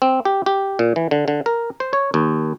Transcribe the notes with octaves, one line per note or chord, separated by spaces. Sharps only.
C4
G4
G4
A#2
E3
D3
D3
A#4
C5
C#5
D#2